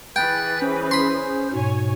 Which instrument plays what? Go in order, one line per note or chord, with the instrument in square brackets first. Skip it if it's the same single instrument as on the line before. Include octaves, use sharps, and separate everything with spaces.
[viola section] E3 G#4 B4 [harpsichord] G5 [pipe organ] F#6 A6
[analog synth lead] C#4 [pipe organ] C5
[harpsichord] B5 C6
[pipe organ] G#2 B2 [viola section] C#5 G#5